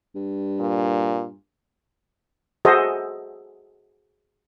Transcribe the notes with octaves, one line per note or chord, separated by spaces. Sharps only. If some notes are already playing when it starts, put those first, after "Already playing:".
G2
A#2
F#4 G#4 A4 C5 D#5 E5